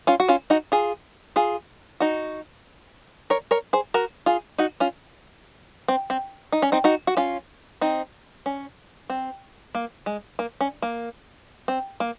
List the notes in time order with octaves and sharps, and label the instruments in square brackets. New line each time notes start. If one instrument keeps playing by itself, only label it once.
[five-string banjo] C#4 F4
F#4
C#4 F4
D#4 F#4
F4 G#4
F4 G#4
D#4 F#4
A#4 C#5
A#4 C#5
G#4 C5
F#4 A#4
F4 G#4
D#4 F#4
C#4 F4
C4
C4
D#4
C#4
C4 D#4
D#4 F#4
F#4
C#4 F4
C4 D#4
C#4
C4
A#3
G#3
A#3
C#4
A#3
C4
A#3